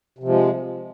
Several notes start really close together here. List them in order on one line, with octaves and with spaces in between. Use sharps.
C3 F3 G#3